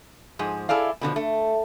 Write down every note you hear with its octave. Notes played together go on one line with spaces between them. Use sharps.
G#2 F3 G#4
E4 G#4 A4 D5 F5
B2 D3 D#3 F3
A3